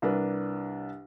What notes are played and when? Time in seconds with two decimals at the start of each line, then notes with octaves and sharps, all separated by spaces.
0.02 C2 D4 A#4 B4